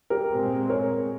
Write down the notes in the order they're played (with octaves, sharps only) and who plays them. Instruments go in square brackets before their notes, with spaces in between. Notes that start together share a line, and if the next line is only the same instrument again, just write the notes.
[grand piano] G4 A#4
[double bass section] A#2 G#3 C4
[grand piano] A#4 C#5